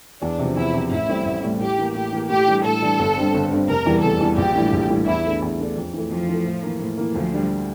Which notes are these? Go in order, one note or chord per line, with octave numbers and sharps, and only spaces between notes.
E2 D4
C3 F3
E2 E4
C3 F3
A1 E4
A2 G3 C4
A1
A2 G3 C4
A2 G4
E3 A#3
A2 G4
E3 A#3
A2 G4
E3 G3 D4
A2 A4
E3 G3 D4
G1
G2 D3 G3 C4
G1
G2 D3 G3 C4
F1 A#4
E2 E3 G3
F1 A4
E2 E3 G3
A#1 G4
A2 E3 G3 D4
A#1
A2 E3 G3 D4
E2 E4
D3 A3 D4
E2
D3 A3 D4
F2
E3 A3
F2 F3
E3 A3
A2
E3 A#3
A2
E3 A#3
D2 F3
D3 G3 D4